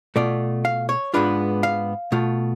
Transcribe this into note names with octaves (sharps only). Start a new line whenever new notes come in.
B2 A3 F4 D5
F5
C#5
G#2 G#3 B3 D4 F4 B4
F5
B2 A3 F4